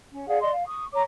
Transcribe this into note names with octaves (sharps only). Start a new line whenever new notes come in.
C#4
G#4 D5 F5 F#5
D5 D#5 C6
F5
C#6 D#6
C#5 A#5 D6